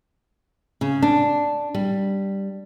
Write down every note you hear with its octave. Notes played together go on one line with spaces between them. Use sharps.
C#3
D4
G3